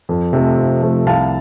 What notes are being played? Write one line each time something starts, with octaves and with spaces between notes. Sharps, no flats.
F2
C3 F3 A3
F2
C3 F3 A3
C2 F5 A5